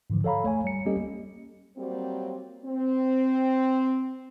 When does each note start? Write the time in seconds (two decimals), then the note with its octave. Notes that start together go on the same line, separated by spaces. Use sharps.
0.10 G#2 D3 E3 F3
0.24 A4 C#5 F5 A#5 B5
0.44 A3 C#5 G#5
0.64 G3 C#7
0.86 G3 A#3 C#4 G4 A4 D#5
1.77 F#3 G3 A#3 C4
2.65 C4